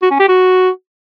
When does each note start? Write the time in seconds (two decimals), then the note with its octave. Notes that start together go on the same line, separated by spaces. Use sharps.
0.02 F#4
0.11 C#4
0.20 G4
0.28 F#4